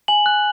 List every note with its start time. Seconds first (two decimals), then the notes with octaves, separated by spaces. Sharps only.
0.08 G#5 F#7
0.26 F#6